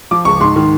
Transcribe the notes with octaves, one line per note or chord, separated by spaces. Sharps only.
F3 D6
C#2 C#6
G#2 C6
D#3